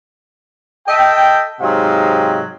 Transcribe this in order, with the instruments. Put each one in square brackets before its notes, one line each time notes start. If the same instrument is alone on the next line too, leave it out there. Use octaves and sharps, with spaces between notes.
[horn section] A4 D#5 E5 G5
G#2 C3 F#3 C4 D#5 F5